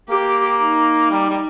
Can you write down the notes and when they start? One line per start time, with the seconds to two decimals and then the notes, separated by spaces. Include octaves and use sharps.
0.09 A#3 G4
0.60 D#4
1.11 G3
1.29 G3